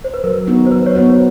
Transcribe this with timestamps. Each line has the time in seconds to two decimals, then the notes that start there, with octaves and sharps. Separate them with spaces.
0.04 C5
0.14 B4
0.24 F#3 A#4
0.47 B3 D#4 F#4
0.67 C5
0.71 F#3 B4
0.86 C#5
0.95 B3 D#4 F#4 C5
1.08 B4